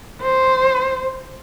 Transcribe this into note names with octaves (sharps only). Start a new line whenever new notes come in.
C5